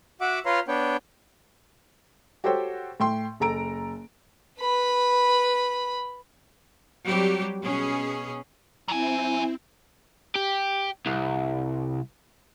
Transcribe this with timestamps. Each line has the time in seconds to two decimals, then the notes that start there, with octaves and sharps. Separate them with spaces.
0.21 F#4 E5 F#5 D6
0.46 F4 B4 C#5 F5 A#5 C6
0.68 B3 D4 C#5 G5
2.44 F#4 G4 A4 C5 C#5 G5
3.00 A2 G5 C6
3.40 F#1 A4 A#5 D7
4.59 B4 B5
7.05 F#3 G3 C4 G4
7.64 B2 C#4 G#4
8.88 F#3 C4 E4 G#5
10.35 G4
11.06 C2